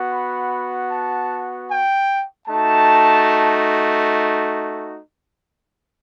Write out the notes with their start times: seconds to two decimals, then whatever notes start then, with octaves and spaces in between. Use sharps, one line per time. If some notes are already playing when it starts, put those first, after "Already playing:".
Already playing: B3 F#4
0.13 B5
0.91 A5
1.70 G5
2.48 A3 D#4 F#4 A5